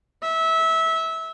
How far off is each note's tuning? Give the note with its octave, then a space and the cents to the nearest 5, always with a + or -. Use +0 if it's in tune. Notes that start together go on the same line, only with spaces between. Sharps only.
E5 -20